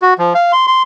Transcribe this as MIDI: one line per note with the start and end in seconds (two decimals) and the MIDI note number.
0.02 0.14 66
0.18 0.33 53
0.35 0.52 77
0.53 0.66 84
0.67 0.83 84